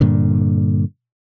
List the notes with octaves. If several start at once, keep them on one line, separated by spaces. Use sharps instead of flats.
G2 A#2 D3